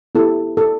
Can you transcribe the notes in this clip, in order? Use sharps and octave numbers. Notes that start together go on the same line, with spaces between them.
B3 E4 G4 A4
A4